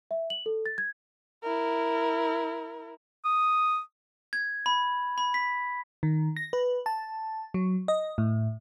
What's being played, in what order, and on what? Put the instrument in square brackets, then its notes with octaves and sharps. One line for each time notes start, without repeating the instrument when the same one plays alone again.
[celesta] E5
F#7
A4
A6
G#6
[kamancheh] E4 A#4
[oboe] D#6
[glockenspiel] G#6
B5
B5
B6
[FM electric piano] D#3
A#6
B4
A5
F#3
D#5
A2